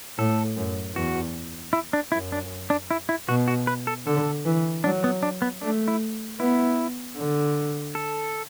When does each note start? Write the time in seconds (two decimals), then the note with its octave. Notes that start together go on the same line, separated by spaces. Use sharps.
0.18 A2 A4
0.57 F#2
0.95 E2 F#4
1.73 E4
1.93 D4
2.12 F#2 E4
2.32 D4
2.70 D4
2.91 E4
3.09 E4
3.29 B2 F#4
3.48 F#4
3.67 B4
3.87 A4
4.07 D3 A4
4.45 E3
4.84 F#3 D4
5.04 B3
5.23 D4
5.42 B3
5.61 A3 D4
5.88 E4
6.40 B3 E4
7.17 D3
7.95 A4